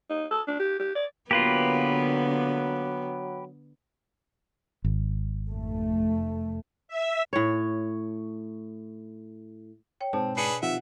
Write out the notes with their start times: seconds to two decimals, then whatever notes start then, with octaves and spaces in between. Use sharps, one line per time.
0.10 D#4
0.31 A4
0.48 D4
0.59 G4
0.79 G4
0.95 D5
1.31 D3 F#3 A#3 B3 F4 G4 B4
4.84 G#1
5.46 F1 A3
6.88 E5
7.33 A2 C#5
10.01 C#5 G5
10.13 G#2 B2 C4 A5
10.37 D4 G#4 B4 C7 C#7 D#7
10.62 C3 D#3 F3 E5 F#5